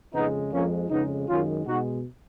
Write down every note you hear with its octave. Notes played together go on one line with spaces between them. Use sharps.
F2 C#3 G#3 B3 D#4
F2 F3 G#3 A#3 C#4
F2 C#3 G#3 B3 D#4
F#2 D#3 G#3 C#4 F4
B2 G#3 D#4 F#4